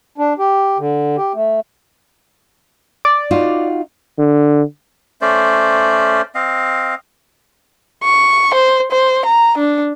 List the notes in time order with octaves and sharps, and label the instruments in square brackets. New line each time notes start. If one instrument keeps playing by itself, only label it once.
[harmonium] D4
G4
D3
G4
A3
[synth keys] D5
[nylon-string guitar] D#4 F4 F#4
[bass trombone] D3
[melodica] A3 C#4 C5 D5
C4 D#5 F5
[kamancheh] C#6
C5
C5
A#5
D4